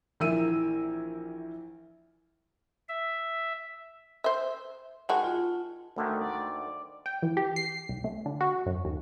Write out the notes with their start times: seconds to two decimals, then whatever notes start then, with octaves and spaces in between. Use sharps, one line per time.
0.20 A#1 E3 A#4 E5 E6 D#7
2.89 E5
4.24 C5 E5
5.09 D#3 G#3 F#4 F#5 A5
5.24 F4
5.96 D2 D3 D#3 A3
6.21 D5
7.06 G5
7.22 E3
7.37 G4
7.56 C7
7.89 C2
8.04 A3
8.26 D3
8.41 F#4
8.66 F#2
8.85 D#2